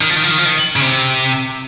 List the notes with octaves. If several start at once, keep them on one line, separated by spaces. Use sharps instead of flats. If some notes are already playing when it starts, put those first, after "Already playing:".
D#3
F3
D#3
F3
D#3
F3
D#3
C#3
C3